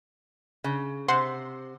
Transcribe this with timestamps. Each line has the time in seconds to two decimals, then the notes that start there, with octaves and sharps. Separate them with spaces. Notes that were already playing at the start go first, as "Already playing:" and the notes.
0.64 C#3
1.08 C3 C5 F#5 C6